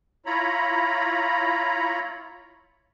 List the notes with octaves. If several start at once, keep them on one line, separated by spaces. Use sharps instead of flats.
E4 F4 C#5 A#5 B5